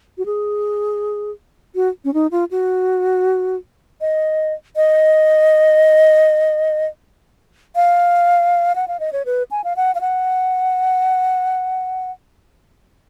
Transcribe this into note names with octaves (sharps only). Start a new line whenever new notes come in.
F#4
G#4
F#4
C#4
D#4
F4
F#4
D#5
D#5
F5
F#5
F5
D#5
C#5
B4
G#5
F5
F#5
F5
F#5